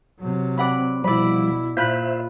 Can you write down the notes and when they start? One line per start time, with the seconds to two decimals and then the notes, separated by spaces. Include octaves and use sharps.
0.20 C3 F#3
0.57 C4 D5 F#5 B5
1.04 B2 F3 G3 E4 D5 B5
1.77 A#2 F4 C5 E5 B5 F#6